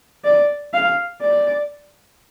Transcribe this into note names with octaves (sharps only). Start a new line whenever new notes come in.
D5
F5
D5